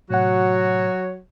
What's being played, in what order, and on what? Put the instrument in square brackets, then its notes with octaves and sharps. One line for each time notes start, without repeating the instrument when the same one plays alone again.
[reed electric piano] A2 C3 F#5 [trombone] F#3 [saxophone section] F#4 C#5